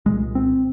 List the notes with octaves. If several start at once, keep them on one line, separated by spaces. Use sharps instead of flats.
C2 A#2 G#3
C4